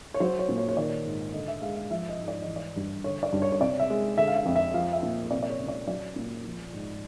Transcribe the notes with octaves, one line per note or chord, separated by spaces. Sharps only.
C#5
F#3 C5
C#5
A#2
C#5
C#5
D#3 D5
G#2
D3 D#5
E5
G#3 F5
F5
F3 E5
D#5
G#2
D5
E3 D#5
D5
G2
D3 C#5
D5
G2
C#5
C#5
C3 D5
E5
G#3
D3 E5
F5
E5
F2
E5
F3 F5
E5
A#2
C3 D5
D5
C#5
C#2
D5
F#3 D5
A#2
F3
G#2